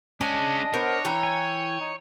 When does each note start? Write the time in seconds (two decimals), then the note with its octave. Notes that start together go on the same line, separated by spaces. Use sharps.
0.21 G#3 C#4 D4 D#5 G#5
0.74 B3 A#4 C5 C#5
1.05 E3 G5 A#5
1.23 G#5
1.80 D#4